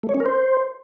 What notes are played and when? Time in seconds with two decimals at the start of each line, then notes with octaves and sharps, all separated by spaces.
0.03 A3
0.09 C#5
0.14 C#4
0.20 A#4
0.26 C5